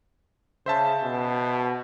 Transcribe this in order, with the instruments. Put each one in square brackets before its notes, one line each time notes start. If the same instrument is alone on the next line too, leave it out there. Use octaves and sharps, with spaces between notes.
[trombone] C#3 [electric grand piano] C5 E5 A5
[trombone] B2